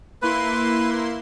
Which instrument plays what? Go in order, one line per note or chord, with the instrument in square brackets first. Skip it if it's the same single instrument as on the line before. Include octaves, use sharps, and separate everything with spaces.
[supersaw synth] A#3 E4 C6 [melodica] B4